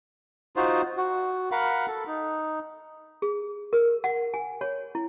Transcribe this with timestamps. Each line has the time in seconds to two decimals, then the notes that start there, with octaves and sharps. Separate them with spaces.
0.56 D#4 F4 F#4 C5
0.97 F#4
1.52 A#4 F5 F#5 B5
1.87 A4
2.07 D#4
3.22 G#4
3.73 A#4
4.04 F#5
4.34 G#5
4.61 C#5
4.95 E4